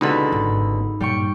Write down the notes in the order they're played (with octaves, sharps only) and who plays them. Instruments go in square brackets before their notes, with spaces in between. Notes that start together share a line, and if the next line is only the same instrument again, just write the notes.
[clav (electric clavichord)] C#2 B2 D3 [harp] D#4 B5 E6
[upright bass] G#1
[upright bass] G2 A#2 [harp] G3 G5 C#6